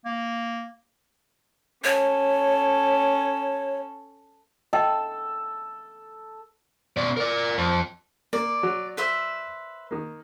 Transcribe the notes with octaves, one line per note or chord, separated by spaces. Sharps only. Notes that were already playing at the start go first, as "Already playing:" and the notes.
A#3
C#4 A4 C#5
A4 D#5 G5
B2 D5
A#4 D5
F2
A#3 D5
F#3
B4 C5 E5
D#3 A#3